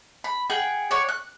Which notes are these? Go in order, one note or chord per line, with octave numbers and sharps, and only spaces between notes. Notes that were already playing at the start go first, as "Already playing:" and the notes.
B5
G#4 F#5 G5
C#5 D5 F#5 C#6
F#6